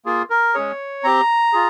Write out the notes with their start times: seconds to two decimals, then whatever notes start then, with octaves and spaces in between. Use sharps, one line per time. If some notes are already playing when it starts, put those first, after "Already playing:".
0.05 A#3 F4 G#4
0.30 A#4
0.54 G#3 C#4 G#4 C#5
1.03 C4 G4 A#5
1.53 F4 G#4